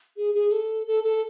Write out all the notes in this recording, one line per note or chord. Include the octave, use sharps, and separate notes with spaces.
G#4
G#4
A4
A4
A4